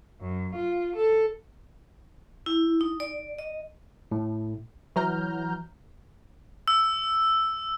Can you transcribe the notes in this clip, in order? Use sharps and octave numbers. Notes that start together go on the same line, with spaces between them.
F#2
F4
A4
E4
D#4
D5
D#5
A2
E3 F#3 A#5 F6 G6
E6